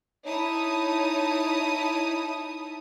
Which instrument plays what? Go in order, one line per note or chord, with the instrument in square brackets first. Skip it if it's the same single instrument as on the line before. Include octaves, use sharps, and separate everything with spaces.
[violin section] D#4 E4 C#5 A5 D#6